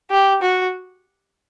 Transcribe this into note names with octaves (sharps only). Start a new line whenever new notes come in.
G4
F#4